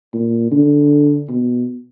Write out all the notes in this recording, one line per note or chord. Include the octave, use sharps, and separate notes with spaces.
A#2
D3
B2